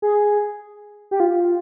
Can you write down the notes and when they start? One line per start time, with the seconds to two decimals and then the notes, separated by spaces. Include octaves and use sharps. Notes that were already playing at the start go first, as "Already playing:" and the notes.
0.02 G#4
1.11 G4
1.20 F4